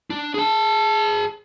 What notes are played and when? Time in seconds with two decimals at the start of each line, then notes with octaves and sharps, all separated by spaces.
0.10 D4
0.34 G#4 A5